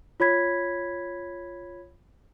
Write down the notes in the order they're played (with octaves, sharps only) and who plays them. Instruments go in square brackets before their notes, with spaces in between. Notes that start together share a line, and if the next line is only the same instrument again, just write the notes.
[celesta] F4 C#5 B5 G#6 B6